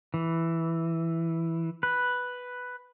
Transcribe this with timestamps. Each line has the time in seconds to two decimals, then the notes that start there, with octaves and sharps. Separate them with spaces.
0.14 E3
1.83 B4